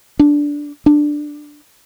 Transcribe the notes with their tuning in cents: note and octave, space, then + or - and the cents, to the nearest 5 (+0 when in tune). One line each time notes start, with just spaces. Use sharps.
D4 -5
D4 +10